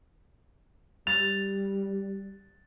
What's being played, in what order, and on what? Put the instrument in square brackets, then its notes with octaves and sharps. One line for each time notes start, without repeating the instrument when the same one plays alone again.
[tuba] G3 [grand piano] A6 [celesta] F7